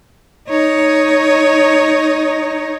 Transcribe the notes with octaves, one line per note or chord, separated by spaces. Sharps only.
D#4 C#5